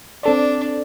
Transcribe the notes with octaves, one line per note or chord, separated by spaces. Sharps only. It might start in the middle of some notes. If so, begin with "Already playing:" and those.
C4 D4 A4 D5